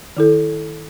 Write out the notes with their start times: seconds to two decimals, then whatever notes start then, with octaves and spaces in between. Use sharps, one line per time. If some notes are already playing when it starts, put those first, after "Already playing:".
0.17 D#3 E4 A4